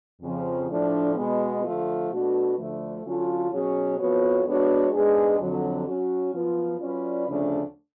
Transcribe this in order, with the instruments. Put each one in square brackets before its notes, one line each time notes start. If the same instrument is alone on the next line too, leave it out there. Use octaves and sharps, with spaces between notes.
[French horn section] F2 C#3 F3
A2 F3 A3 D4
B2 G#3 B3
D3 F3 A3 F4
B2 A3 D4 F#4 B4
D2 D3 F3 A3
D3 F#3 C#4 F4 A4
B2 F#3 C#4 G#4 C#5
F2 F3 B3 F#4 C#5
G#3 B3 D4 F#4 C#5
G#2 G#3 B3 D4 G#4
F2 D3 F#3
F#3 C#4 F#4
F#2 F3 B3 F4
F#3 C#4 F4 B4 D5
D2 C#3 F3 A3 D4